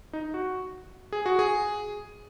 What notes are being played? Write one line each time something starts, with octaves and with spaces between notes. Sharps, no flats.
D#4
F#4
G#4
F#4
G#4